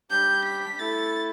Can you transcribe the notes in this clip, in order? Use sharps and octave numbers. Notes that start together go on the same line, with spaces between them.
G3 D4 G4 G6
B6
A3 E4 A4 A6